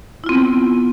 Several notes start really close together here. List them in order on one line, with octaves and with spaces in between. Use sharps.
E4 F4 C4 B3